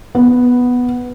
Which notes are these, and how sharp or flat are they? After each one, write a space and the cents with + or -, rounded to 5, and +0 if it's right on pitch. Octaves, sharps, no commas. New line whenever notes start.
B3 +0